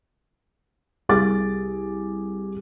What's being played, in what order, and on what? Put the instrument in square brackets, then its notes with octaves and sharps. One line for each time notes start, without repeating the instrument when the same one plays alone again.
[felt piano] C2 G#4 D6 A6